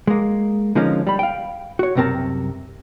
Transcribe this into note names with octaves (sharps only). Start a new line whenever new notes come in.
G#3 A#3
D3 F3 G#3 A#3 C#4 D#4
G3 B5
F5 G5
F#4 C#5
C2 F#2 C3 C4 A#4 A5